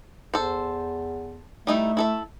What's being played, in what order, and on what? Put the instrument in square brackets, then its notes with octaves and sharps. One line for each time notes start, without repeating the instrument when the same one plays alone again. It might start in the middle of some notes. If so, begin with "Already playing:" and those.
[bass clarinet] E2 [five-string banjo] A4 C5
[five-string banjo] G3 D#4 E4 [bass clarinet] A3
[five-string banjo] E4 A4 E5